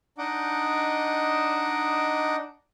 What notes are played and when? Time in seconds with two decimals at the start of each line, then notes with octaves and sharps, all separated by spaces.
0.18 D4 D#4 D#5 F#5 D6